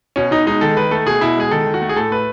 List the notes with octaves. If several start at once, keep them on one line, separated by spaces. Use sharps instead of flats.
B2 C#4
B2 D#4
G#3 D#4
D#3 A4
D#3 B4
A3 A4
B2 G#4
B2 E4
G#3 G#4
D#3 A4
D#3
F#4
A3
G#4
A2 A4
A3 B4